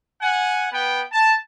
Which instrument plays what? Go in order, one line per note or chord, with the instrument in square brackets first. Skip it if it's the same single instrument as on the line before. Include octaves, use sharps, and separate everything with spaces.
[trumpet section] F#5 G#5
B3 B4 G5
A5